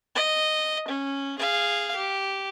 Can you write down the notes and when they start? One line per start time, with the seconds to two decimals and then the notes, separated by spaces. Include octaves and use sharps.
0.15 D#5
0.88 C#4
1.39 G#4 F5
1.96 G4